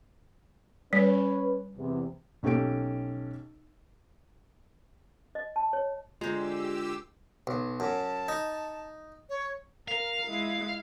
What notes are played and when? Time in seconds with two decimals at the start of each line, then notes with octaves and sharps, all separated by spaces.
0.93 G3 C#4 B4
1.77 E2 C3
2.43 B1 C#4 G4 A4 G5 D7
5.35 D#5
5.56 A5
5.73 C#5
6.21 D3 G#3 F4 G4 C5 A#5 E6
7.47 B1
7.80 F#2 A5
8.28 D#4
9.29 C#5
9.88 A#4 F5
10.28 G#3 E4